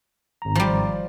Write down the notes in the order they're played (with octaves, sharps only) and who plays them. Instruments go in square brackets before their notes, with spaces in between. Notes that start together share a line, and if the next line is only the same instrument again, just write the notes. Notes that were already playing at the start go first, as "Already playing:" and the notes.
[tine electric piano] G#1 A#5
[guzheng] F3 G3